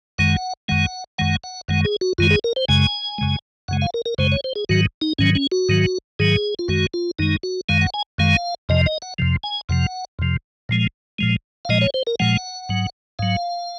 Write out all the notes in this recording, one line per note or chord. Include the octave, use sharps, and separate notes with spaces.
F#2 D#3 G#3 F#5
F#2 D#3 G#3 F#5
F#2 D#3 G#3 F#5
F#5
F#2 D#3 G#3 F#5
G#4
F#4
F#2 D#3 G#3 F4
G#4
A#4
C5
F#2 C#3 G#3 G#5
F#2 C#3 G#3
F#2 C#3 G#3 F#5
F5
A#4
A#4
F#2 C#3 G#3 C5
C#5
C5
G#4
G#2 D#3 F#3 F#4
D#4
G#2 D#3 F#3 C#4
C#4
F#4
G#2 D#3 F#3
G#2 D#3 F#3 G#4
F4
F#2 D#3 G#3 F#4
F4
F#2 D#3 G#3 D#4
F#4
F#2 D#3 G#3 F5
F#5
G#5
F#2 D#3 G#3 F5
F2 C3 F3 D#5
D#5
F#5
F2 C3 F3
G#5
F2 C3 F3 F#5
F2 C3 F3
A#2 F3 G#3
A#2 F3 G#3
F5
A#2 F3 G#3 D#5
C#5
C5
A#4
A#2 F3 G#3 F#5
G#2 F#3
G#2 F#3 F5